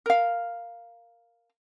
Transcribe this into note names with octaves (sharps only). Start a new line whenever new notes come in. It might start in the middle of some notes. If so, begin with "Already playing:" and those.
A#4 F5